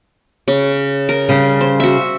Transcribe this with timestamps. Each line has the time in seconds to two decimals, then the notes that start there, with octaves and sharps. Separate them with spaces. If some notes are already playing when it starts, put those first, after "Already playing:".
0.48 C#3
1.09 A#4
1.29 C#3 G3
1.61 C5
1.80 F#4 E5